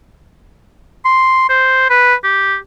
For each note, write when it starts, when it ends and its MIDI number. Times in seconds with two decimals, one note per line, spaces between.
1.05 1.45 84
1.49 1.89 72
1.90 2.15 71
2.24 2.56 67